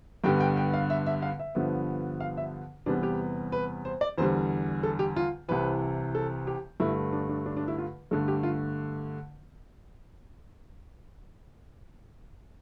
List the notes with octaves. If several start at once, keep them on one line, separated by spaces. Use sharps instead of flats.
G2 D3 G3 B3 G5
G5
G5
F5
E5
E5
F5
E5
G2 D3 F3 B3
F5
E5
E2 C3 G3 B3 D4
G4
B4
C5
D5
E2 D3 G3 C5
A4
G4
F4
C2 C3 E3 B4
A4
G4
G2 D3 A3 E4
D4
D4
D4
D4
E4
F4
G2 D3 A3 A4
G4
F4